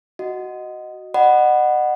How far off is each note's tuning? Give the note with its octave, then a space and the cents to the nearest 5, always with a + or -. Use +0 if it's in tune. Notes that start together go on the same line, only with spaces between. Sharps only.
F#4 +0 D#5 +0
D#5 -40 F#5 +5 B5 +0